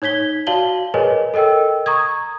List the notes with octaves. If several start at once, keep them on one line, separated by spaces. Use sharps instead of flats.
D#4 C#5 G#6 B6 G7
F#4 D5 F5 A5 F#7 G7
G#4 A#4 B4 C#5 D#5 G#5
A4 A#4 D#5 G5 E6
A#5 C#6 D#6 G#6